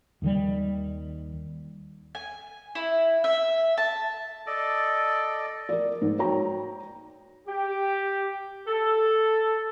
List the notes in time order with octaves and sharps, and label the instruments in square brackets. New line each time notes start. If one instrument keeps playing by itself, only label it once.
[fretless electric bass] D#2 D#3 G3
[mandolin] G#5
E4
E5
A5
[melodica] A4 D5 D#5
[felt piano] A#4 D5
G#2
F#4 C#5 G5 A#5
[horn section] G4
A4